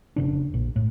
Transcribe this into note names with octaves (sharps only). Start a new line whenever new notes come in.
F1 C#3 D4
A#1
A2